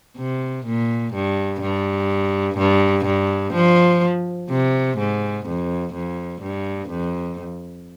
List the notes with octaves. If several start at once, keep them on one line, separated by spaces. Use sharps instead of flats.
C3
A#2
G2
G2
G2
G2
F3
C3
G#2
F2
F2
G2
F2